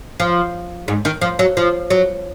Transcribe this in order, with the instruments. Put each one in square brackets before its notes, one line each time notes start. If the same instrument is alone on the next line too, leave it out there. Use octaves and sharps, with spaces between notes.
[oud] F3
G#2
D#3
F3
F#3
F3
F#3